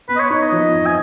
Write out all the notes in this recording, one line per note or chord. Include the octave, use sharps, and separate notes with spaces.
B3 B4
D#5
C#5
D#4 C#5
D#5
F3
F2
G#5